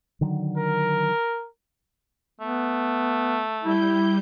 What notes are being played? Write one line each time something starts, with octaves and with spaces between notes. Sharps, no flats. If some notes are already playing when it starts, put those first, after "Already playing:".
D3 D#3 F#3
A#4
A3 B3
G3 E4 G6